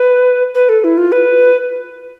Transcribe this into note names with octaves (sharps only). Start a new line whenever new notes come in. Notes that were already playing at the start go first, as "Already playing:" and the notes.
Already playing: B4
B4
A4
E4
F4
B4